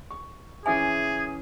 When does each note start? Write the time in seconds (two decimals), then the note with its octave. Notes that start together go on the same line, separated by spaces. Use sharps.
0.10 C#6
0.66 E3 C#4 G#4 E5 G#5 D6